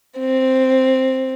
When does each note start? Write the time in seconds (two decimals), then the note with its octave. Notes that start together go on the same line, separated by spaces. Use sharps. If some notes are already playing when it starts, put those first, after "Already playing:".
0.19 C4